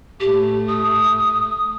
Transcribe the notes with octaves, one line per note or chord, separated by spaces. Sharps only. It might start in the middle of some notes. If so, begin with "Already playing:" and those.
A2 A3 G4
D#6